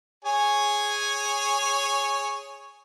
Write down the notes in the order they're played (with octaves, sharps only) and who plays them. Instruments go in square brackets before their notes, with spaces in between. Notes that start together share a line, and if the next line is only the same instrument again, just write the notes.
[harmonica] G#4 C#5 G#5